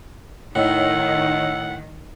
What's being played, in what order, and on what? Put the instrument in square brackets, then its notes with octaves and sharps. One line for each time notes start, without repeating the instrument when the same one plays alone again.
[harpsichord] A2 [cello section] D#3 [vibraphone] C#5 D#5 E6 [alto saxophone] F#5